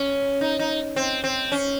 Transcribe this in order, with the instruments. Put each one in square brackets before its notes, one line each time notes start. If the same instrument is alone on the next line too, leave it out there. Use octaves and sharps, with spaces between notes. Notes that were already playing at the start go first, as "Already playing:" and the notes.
Already playing: [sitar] C#4
D#4
D#4
C4
C4
C#4